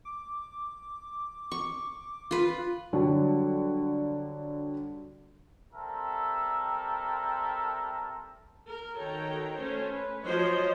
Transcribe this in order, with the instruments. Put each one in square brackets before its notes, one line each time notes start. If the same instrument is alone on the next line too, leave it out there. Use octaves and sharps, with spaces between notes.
[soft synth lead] D6
[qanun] C#6
F4 B4
[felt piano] D3 F#3 G3
[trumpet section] G3 C4 A4 A#4 E5
[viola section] A#4
D#3 F#4 A4 C#5 G5 A#5
A3 C#4 C5 C#5
B4
F3 F#3 C5 C#5 D#5